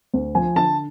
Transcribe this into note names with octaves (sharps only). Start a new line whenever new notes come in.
D2
F3 G#5
D3 A5